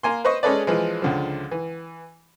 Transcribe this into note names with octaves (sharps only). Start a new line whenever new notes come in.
A#3 G#5 C6
B4 C5 D#5 C#6
G#3 C#4 G#4 A4 B4 D5
E3 F3 G#3
C#2 D3 F3
E3